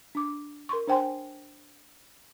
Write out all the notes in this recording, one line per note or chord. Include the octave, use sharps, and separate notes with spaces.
D4 D6
A#4 C6 C#6
D4 C5 G5 G#5 C6